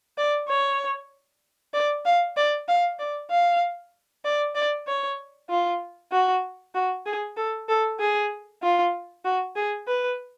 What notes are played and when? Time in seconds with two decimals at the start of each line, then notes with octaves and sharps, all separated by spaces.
0.18 D5
0.49 C#5
1.74 D5
2.05 F5
2.37 D5
2.68 F5
2.99 D5
3.31 F5
4.25 D5
4.55 D5
4.87 C#5
5.50 F4
6.12 F#4
6.75 F#4
7.06 G#4
7.37 A4
7.68 A4
8.00 G#4
8.63 F4
9.25 F#4
9.56 G#4
9.88 B4